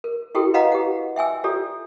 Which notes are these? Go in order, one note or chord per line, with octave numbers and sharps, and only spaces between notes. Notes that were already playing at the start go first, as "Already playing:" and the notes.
A#4
E4 F#4 G4 A4 A#4 G5
B4 D#5 F5 F#5 A#5
G4 F#5
E5 G5 G#5 E6
F4 G4 A4 D5